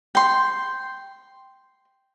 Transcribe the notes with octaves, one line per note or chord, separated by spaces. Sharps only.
G5 C6